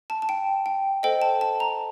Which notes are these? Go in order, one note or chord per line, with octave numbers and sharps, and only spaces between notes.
A5
A5
G5
G5
A4 C5 D#5 G5
A5
A5
A#5